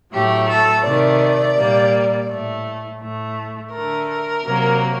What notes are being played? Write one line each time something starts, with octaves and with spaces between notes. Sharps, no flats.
A2 F#3 A3 G4
A4
C3 D#3 A3 D5
A#2 G3 A#3
A2 A3
A2 A3
D3 A3 A#4
C3 F#3 A#3